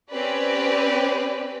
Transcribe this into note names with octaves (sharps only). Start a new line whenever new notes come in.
C4 C#4 G4 B4 D5